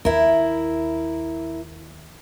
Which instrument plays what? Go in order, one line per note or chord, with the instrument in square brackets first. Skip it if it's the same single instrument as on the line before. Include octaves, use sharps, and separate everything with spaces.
[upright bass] D#2 [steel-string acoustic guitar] E4 A#4